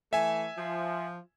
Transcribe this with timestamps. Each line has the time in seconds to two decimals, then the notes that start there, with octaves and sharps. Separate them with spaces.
0.13 E3 A3 E5 G#5
0.58 F3